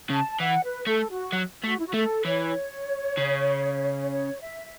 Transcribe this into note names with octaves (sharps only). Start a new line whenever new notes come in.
C#3 A5
E3 F#5
B4
A3 A4
F#4
F#3
A3 F#4
E4
F#4
A3 A4
E3 C#5
C#3
C#5
E5